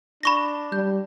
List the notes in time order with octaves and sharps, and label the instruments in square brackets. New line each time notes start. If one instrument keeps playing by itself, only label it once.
[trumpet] D4 [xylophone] B5 C#6 A#6
[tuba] G3 [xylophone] G6